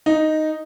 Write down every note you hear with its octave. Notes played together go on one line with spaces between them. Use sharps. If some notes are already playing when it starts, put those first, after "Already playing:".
D#4